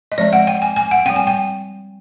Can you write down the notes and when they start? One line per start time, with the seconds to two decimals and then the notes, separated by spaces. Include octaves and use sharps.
0.12 D#5
0.18 F3 G#3 C4 D5
0.33 F#5
0.47 G5
0.62 G#5
0.76 G#5
0.91 F#5
1.05 G3 C4 G5
1.16 G#5
1.27 G5